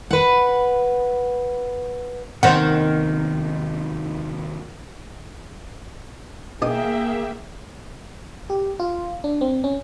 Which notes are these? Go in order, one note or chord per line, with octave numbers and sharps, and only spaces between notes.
B4 F#5
D#2 C3 D#3 B3 C5 F#5
B2 A#3 D#4 G#4 E5 G5 D#6
G4
F4
D4
C4
C#4